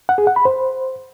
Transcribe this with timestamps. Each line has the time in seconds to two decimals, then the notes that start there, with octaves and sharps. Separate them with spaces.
0.09 F#5
0.18 G#4
0.27 F#5
0.36 B5
0.45 C5